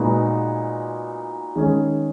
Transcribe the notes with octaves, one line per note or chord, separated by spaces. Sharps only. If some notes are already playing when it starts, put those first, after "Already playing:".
Already playing: A#2 G#3 B3 D#4 F#4
D#3 G#3 C#4 G#4